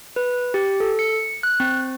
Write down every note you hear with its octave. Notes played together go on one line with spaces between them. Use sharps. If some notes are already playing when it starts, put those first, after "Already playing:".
B4
G4
A4
C#7
F#6
C4